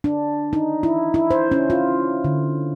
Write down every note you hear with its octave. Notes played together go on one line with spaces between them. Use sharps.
D4
D#4
E4
E4
C5
C#4
F4
D3